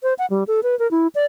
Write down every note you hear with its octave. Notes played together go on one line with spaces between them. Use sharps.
C5
F#5
G3
A4
B4
A#4
E4
D5